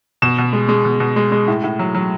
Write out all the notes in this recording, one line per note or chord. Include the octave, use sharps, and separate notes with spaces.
B2 E7
B2
G#3
G#3
B2
B2
G#3
G#3
A2
A2
F#3
F#3